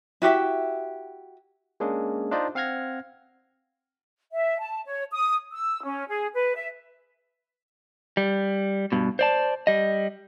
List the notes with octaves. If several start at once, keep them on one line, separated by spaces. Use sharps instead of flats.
E4 F#4 G4 E5
G#3 A#3 C#4 D4 G#4
D4 D#4 F4 C5 D5 D#5
C4 F5 F#5 F6 G#6 A#6
E5
A5
C#5
D#6
E6
C#4
G#4
B4
E5
G3
G2 B2
C5 D5 A5
G3 D#5